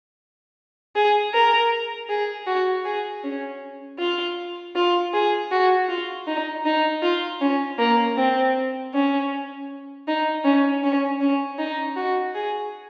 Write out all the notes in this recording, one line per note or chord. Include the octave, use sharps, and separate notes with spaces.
G#4
A#4
G#4
F#4
G#4
C#4
F4
F4
G#4
F#4
F4
D#4
D#4
F4
C#4
A#3
C4
C#4
D#4
C#4
C#4
C#4
D#4
F#4
G#4